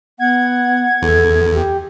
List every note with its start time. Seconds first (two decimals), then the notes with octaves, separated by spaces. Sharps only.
0.19 B3 F#5 G#6
1.02 E2 A4
1.54 G4